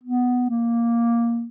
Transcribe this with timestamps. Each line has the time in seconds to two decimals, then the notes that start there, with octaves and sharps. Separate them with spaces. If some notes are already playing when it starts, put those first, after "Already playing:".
0.03 B3
0.50 A#3